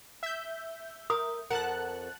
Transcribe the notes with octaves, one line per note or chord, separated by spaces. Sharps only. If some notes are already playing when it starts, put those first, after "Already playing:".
E5 G6
A#4 D#6
F2 A#4 F#5 A5 F#6